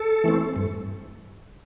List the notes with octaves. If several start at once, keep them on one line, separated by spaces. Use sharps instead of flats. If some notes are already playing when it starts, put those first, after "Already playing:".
Already playing: A4
E3 A3 C4
G2